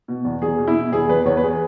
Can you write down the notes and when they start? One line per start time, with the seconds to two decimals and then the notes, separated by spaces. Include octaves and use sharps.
0.08 B2
0.25 E2
0.42 E2 G#4
0.58 B2
0.67 E4
0.75 B2
0.92 E2 G#4
1.08 E2 B4
1.25 E2 C#5
1.37 B4
1.43 G#4